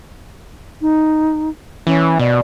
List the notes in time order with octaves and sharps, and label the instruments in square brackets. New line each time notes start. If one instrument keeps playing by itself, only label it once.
[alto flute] D#4
[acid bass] E3 [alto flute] C#4
[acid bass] B2 [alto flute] D5